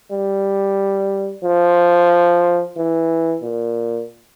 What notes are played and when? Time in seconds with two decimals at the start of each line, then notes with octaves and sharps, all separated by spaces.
0.12 G3
1.44 F3
2.76 E3
3.43 A#2